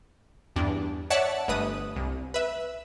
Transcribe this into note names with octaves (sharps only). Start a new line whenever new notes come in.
E2 G2 D4
C#5 D5 E5 F#5 A5
G1 A3 B4 D#6
C2
B4 E5